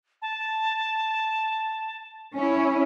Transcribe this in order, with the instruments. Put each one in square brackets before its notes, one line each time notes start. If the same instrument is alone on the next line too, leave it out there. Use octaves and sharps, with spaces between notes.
[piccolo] A5
[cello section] C#4 E4